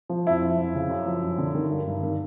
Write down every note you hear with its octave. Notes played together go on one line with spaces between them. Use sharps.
F3
F2 E4
F3
F2
C#3
F#2
F3
F#2
D3
D#3
G2
G2
D#3